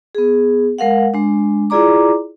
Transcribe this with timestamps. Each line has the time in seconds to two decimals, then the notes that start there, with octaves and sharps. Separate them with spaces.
0.15 B3 G#4
0.78 G#3 A#4 F5 F#5
1.14 G#3 D4
1.70 E4 F4 G#4 D5 A#5 D6